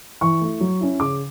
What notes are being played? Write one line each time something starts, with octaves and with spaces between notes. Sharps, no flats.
E3 C#6
A3 E4
F#3
C#4 E4
C#3 D6